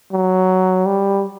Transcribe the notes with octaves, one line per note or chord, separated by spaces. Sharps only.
F#3
G3